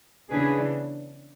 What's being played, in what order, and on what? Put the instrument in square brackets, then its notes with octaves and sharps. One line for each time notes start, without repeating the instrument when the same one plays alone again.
[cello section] C#3 E3 B3 D4 G#4 B4